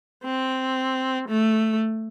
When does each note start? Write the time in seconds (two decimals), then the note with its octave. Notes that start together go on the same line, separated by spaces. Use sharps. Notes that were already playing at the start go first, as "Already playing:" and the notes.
0.24 C4
1.29 A3